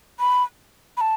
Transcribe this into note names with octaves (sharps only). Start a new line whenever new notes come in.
B5
B5
A5